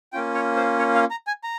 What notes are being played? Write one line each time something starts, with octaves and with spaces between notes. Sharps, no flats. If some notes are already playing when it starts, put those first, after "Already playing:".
A#3 C#4 F4 G5
C#5
C5
C#5
F5
A#5
G#5
A#5